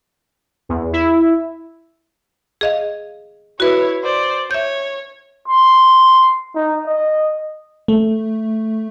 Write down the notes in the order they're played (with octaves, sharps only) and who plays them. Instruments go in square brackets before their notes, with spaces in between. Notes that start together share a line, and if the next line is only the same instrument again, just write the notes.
[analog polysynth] E2
E4
[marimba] G#4 D#5 F5
[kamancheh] E4 C#5 [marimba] F#4 B4
[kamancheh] C5 D5
[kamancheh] C#5 [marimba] E5 G6
[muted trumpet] C6
D#4
D#5
[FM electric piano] A3